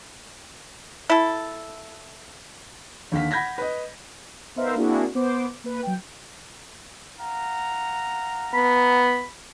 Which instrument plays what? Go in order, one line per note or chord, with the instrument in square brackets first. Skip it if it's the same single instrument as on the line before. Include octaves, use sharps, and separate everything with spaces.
[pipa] E4 A4
[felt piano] D#2 D3 F5 B6
F#5 B5 G6 G#6 A#6 B6
B4 D#5
[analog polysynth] B3 D#4 A#4 C5 E5 F5
A#3 C4 D4 E4 F#4 G#4
B3 C5 D6
A#3 B4
F#3 G5
[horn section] F5 F#5 A#5
[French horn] B3 [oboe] B5